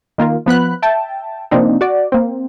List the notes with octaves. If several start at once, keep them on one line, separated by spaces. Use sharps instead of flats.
D#3 A#3 F4 A#4
F3 B3 B5 F#6
E5 G5 A5
C3 F3 A#3 C4 D4 D#4
F#4 D5
A#3 C4